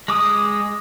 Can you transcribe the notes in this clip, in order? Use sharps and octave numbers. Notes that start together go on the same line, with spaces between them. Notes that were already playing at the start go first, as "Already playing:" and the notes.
G#3 D6 D#6